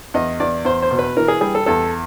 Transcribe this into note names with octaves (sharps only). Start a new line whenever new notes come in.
E2 D#5
E2 D5
E2 C5
C5
B2
B4
E3 A#4
G#4
G3 G#4
A4
E2 A4